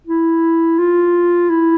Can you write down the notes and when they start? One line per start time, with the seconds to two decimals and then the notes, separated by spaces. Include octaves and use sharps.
0.07 E4
0.79 F4
1.50 E4